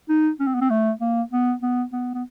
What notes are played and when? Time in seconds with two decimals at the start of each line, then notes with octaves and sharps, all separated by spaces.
0.09 D#4
0.40 C#4
0.47 C4
0.55 B3
0.61 C4
0.70 A3
1.01 A#3
1.32 B3
1.62 B3
1.92 B3
2.14 B3